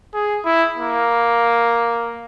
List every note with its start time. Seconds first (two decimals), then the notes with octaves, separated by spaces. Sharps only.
0.14 G#4
0.45 E4
0.77 A#3